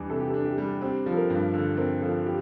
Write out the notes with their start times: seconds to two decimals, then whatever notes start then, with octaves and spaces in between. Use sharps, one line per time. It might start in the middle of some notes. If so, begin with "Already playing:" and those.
Already playing: E2 G3 D4
0.10 C3 A4
0.20 G4
0.30 D4 A4
0.45 G4
0.58 G3
0.81 C4 G4
1.06 F3
1.12 A4
1.17 A#4
1.30 G2
1.54 D3 A4
1.77 C4 A#4
2.02 F3 A4
2.26 G4